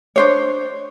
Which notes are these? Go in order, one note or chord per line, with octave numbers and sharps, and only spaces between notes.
D4 C5 C#5